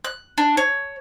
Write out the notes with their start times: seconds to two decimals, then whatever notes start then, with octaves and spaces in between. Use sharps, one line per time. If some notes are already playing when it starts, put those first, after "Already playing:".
0.05 F#6
0.38 D4
0.57 C#5